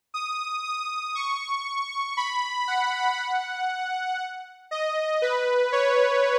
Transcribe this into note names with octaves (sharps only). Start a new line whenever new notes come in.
D#6
D#6
C#6
B5
F#5
D#5
B4
C#5